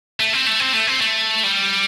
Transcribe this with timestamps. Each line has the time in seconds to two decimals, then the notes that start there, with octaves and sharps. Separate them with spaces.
0.20 A3
0.33 C4
0.46 A3
0.60 C4
0.73 A3
0.87 C4
1.01 A3
1.43 G3